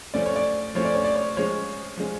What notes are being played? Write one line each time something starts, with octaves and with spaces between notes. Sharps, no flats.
F3 A3 C#4 D5
C#5
D5
F3 A3 C#4 C#5
D5
C#5
D5
C#5
F3 G#3 C#4 C#5
F3 G#3 C#4